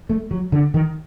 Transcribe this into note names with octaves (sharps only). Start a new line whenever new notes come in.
A3
F#3
D3
D#3